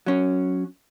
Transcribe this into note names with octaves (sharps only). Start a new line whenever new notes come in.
F#3 C#4